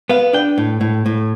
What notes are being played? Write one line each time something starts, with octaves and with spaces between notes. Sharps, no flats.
B3 F5
D4 G5
A2
A2
A2